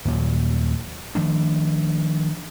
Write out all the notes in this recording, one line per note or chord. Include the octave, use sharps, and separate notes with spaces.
D#2 A#2 F#3
D#3 F3 A3 D4